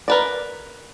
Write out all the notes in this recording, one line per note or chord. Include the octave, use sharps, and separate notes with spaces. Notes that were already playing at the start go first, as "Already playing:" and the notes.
A#4 B4 D5